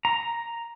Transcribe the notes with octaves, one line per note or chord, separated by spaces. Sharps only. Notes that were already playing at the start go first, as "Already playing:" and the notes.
A#5